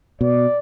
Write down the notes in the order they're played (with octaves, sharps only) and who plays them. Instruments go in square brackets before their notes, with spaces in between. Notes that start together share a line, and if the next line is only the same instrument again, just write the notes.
[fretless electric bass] B2 [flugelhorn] D5